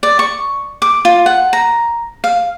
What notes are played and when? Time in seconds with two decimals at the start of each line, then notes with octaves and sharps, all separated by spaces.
0.03 D5
0.19 C#6
0.82 D6
1.05 F4
1.26 F#5
1.53 A#5
2.24 F5